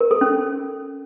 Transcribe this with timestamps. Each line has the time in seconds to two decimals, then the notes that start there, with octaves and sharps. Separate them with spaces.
0.01 A#4
0.11 A4
0.21 C#4